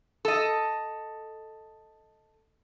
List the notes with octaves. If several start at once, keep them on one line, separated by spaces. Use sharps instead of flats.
A4 D#5